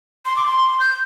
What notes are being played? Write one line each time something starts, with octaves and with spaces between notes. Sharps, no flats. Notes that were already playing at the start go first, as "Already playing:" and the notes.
C6
D6
C6
G6